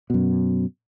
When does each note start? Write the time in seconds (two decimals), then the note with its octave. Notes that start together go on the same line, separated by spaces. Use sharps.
0.10 F#2 B2